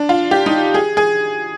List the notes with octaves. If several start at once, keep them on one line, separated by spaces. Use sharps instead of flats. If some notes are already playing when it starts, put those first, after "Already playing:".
Already playing: D4
F4
G4
D#4
G#4
G#4